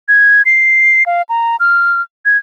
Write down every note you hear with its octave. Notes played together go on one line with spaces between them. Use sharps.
G#6
C7
F5
A#5
F6
G#6